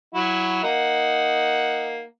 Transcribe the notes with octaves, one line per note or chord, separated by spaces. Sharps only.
F#3 E4 F#4
A#3 D#4 F#5